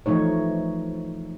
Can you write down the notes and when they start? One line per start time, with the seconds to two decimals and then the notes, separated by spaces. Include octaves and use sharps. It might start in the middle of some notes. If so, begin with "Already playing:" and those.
0.06 E3 F3 A3 D#4 C#5